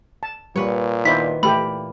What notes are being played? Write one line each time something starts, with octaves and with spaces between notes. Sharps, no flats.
A5
A#2 G3 F#4 B4 C#5
D#3 B3 E4 C5 D5 B6
A#2 E3 A3 G4 B5